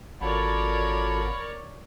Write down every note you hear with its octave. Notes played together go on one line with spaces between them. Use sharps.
G#1 F4 F#4 A4 A#4 C#5 D5 B5